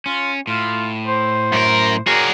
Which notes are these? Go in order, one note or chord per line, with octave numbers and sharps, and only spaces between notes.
C#4 F4
A2 F4
C5
F#2 A#4
F#4 G#4 A#4 C#5 D5